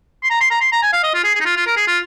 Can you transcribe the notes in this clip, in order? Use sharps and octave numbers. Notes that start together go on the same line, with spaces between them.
C6
A#5
C6
A#5
C6
A#5
G#5
F5
D#5
F4
G#4
G#4
D#4
F4
F4
A#4
G#4
F4